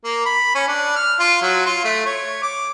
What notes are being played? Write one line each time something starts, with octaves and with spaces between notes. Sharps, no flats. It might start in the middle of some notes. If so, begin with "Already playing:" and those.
A#3
B5
C#4
D4
F6
F4
F#3
F4
A3
C#5
D6